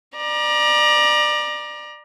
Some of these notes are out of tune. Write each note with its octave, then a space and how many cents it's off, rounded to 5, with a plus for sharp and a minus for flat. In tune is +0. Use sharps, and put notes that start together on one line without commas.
D5 +25 A#5 +30